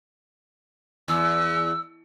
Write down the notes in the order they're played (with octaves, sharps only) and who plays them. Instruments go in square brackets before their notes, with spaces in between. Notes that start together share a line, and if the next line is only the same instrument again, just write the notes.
[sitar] E2 [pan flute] E6